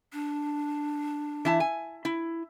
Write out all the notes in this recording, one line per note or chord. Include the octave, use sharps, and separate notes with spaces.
D4
E3 E4 A5
G#5
E4